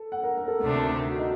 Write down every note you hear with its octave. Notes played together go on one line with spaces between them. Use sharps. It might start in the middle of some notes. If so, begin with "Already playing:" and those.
Already playing: A4
F#5
A#4
A#4
A4
D2 C3 D#3 A3 D4
F#4
D#4